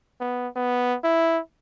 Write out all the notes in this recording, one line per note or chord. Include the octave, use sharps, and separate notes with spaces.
B3
B3
E4